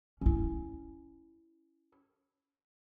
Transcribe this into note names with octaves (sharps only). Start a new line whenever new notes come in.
C#4 E4